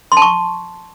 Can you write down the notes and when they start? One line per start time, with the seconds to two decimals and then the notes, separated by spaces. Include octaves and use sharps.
0.12 C6
0.17 A5
0.22 C#6